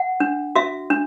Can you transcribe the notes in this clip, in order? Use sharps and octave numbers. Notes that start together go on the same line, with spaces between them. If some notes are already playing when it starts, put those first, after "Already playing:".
Already playing: F#5
D4
F#4 E5
D4